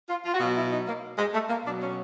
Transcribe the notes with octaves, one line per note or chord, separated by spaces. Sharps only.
F4
F4
F#4
B2 F#3 F4
E4
D#4
A#3
G#3
A3
A#3
B2 F#3 D4
C#4